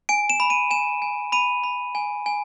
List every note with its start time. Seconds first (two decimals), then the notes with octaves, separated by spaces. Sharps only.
0.09 G#5 D7
0.30 E7
0.40 B5
0.50 D#7
0.71 G#5 E7
1.02 G#5
1.32 B5 D#7
1.64 B5
1.95 G#5
2.26 G#5